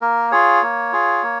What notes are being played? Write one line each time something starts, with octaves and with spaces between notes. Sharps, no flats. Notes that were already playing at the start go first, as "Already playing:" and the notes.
A#3 A#4
F4 G#4 C#5
A#3
F4 G#4
A#3